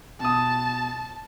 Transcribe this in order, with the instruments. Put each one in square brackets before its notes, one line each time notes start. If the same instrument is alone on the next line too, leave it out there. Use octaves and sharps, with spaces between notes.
[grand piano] B2 D#6 [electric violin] A5